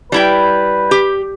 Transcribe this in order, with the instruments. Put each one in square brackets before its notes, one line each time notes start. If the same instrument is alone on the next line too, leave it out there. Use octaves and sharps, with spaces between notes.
[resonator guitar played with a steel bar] G3 E4 G5 [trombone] B4
[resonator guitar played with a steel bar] G4